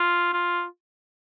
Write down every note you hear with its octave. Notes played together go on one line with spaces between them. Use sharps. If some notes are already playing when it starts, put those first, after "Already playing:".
Already playing: F4
F4